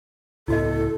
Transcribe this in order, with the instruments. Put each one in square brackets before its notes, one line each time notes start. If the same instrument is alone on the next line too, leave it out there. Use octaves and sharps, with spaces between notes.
[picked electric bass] C#2 A2 B3 [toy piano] E4 F#4 D#5 [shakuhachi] A4